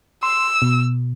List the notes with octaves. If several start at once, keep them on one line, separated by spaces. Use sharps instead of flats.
C6 E6
B2